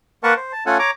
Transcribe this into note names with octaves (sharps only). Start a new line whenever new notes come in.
A#3 A#4 B4 F#5 A5 C#6
C5
A5
A3 C#4 F4 A4 F#5 G#5
C#5 A#5 D6